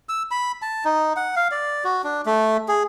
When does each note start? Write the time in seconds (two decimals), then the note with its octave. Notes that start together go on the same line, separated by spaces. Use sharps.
0.09 E6
0.31 B5
0.62 A5
0.85 D#4
1.17 F#5
1.36 F5
1.51 D5
1.84 F#4
2.04 D4
2.26 A3
2.68 G#4